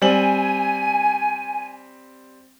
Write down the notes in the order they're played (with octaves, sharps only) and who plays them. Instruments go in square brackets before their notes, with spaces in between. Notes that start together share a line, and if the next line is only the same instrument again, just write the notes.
[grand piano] G3 C4 F#7 [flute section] G#5